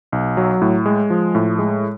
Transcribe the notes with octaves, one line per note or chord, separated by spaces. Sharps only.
B1
F#3
A2
G#3
F3
A2
G#3